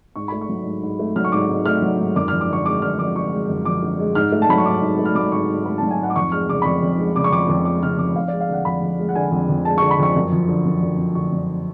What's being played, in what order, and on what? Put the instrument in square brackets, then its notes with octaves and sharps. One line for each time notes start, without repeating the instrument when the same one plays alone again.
[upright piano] G#2 C#6
A3 B5
C#6
F#3
G#2
G#2
A3
F#3 F6
C#6
G#2 D6
G#2
A3 F6
F#3
G#2
F#2 D6
F3 F6
D6
D3 C#6
G#3 D6
F#2 F6
F3 D6
D3 C#6
G#3
F#2
F3 D6
D3
G#3
G#2 F6
A3
A5
F#3 B5
C#6
G#2 D6
G#2
A3
F6
F#3 D6
G#2 C#6
G#2
A3 B5
F#3 A5
G#5
G#2 F#5
D6
F2 C#6
G#3 F6
C#3 D6
B5
F2 C#6
F2
G#3
C#3 D6
C#6
F2 D6
F2 D6
G#3 D6
C#3 F6
F2 D6
F2 F5
G#3 D5
F5
D3 F#5
F2 B5
F2
G#3
F#5
D3 G#5
F2
F2
G#3 A5
D3 C#6
B5
F2 C#6
F#2
F3
D3
F#2
F#2
F3
D3 C#6
F#2